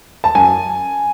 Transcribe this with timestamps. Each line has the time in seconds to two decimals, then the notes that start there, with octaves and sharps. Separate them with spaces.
0.24 A5
0.35 F#2 G#5